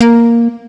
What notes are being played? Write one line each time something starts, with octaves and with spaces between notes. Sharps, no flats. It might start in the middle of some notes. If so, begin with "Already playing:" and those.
A#3